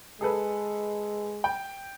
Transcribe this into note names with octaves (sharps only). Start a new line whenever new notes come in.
G#3 G#4 A4 B4
G5